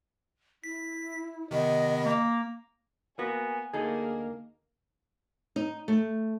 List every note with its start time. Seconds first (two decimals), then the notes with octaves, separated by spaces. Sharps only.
0.64 E4 B6
1.51 C3 D#3 B3 D#5
2.05 A#3
3.19 A#3 B3 F#4 G#5
3.74 D2 A#3 D#4 G#4 A4
5.56 D#4
5.88 A3